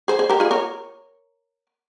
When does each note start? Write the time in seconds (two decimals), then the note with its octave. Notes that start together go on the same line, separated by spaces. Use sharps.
0.08 G#4 C5
0.19 G#4 C5
0.29 G4 A#4
0.40 F4 G#4
0.51 A#4 C#5